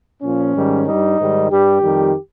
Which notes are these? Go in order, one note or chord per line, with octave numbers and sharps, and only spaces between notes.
A#2 F3 C#4
G#2 D#3 G3
G2 G3 D#4
G#2 D#3 G3
G2 G3 G4
F2 D#3 G3